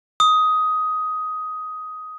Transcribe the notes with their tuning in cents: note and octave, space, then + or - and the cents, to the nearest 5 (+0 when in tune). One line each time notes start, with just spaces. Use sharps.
D#6 +10